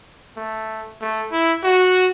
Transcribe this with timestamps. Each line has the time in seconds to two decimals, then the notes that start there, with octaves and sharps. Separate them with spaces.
0.37 A3
1.01 A3
1.32 E4
1.64 F#4